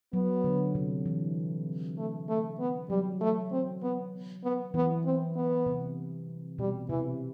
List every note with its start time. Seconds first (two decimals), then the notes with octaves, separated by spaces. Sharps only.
0.13 F#3 B3
0.44 D3
0.75 C3
1.06 E3
1.98 A3
2.29 A3
2.59 B3
2.90 F#3 G3
3.21 A3
3.52 C4
3.83 B3
4.44 B3
4.74 E3 B3
5.05 C4
5.36 B3
5.66 C3
6.58 B2 G3
6.89 C3 E3